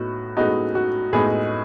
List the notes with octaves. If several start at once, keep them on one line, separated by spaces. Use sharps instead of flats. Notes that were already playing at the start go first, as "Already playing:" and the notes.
Already playing: A2 B3 D#4 F#4
A2 G#3 B3 D#4 F#4
F#4
A2 G#3 B3 D#4 G#4